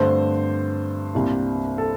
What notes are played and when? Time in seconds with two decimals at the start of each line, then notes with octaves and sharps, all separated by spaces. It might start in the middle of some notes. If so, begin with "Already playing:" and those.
Already playing: G2 D3 A3 C4 C5
1.14 C2 C3 G3 A#3 D4
1.78 A4